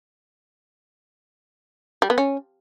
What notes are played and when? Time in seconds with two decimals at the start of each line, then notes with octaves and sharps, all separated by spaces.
2.02 G3
2.10 B3
2.18 C#4